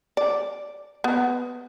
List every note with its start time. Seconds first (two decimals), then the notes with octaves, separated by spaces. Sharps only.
0.17 D5
1.04 B3